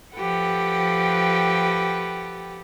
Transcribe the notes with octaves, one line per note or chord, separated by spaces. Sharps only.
F3 G4 A4 B4 F#5 G5